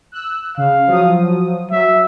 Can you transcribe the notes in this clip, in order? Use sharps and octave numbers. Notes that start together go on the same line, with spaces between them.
E6 F#6
C#3 F5
F3 F#3 D#6
F#3 E5